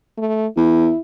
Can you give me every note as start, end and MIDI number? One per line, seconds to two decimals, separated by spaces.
0.17 0.47 57
0.57 0.90 40
0.57 1.00 64